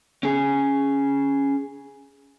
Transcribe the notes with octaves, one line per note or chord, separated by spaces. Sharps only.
C#4 G#4